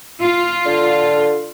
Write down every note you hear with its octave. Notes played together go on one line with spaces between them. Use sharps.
F4
D3